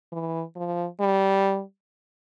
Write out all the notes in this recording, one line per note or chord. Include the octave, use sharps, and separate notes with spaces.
E3
F3
G3